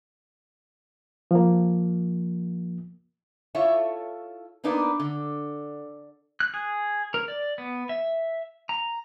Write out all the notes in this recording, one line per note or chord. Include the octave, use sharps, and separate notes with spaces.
F3 A#3
E4 F4 A4 C#5 E5
A#3 B3 D4 D#4 A#4 B4
D3
F#6
G#4
A#4
D5
B3
E5
A#5